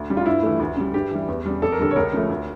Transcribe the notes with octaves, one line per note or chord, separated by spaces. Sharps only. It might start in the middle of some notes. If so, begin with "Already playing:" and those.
Already playing: D2
C#3 G3
F4
G2 E4
E3 A3
D2
C#3 G3
G2 G4
E3 G3
E2
C#3 G3
F2 A4
A#4
D3 G3 A4
C#5
C#2 A#4
C#3 F3 A3
D2